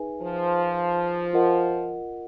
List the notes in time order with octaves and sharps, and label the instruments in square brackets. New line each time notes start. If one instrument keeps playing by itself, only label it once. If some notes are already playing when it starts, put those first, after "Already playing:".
Already playing: [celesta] D#4 G#4 B4 E5 G#5
[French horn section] F3
[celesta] F4 A#4 D#5 F#5